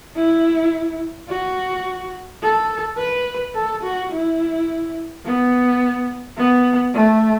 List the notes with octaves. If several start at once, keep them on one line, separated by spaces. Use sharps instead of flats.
E4
F#4
A4
B4
A4
F#4
E4
B3
B3
A3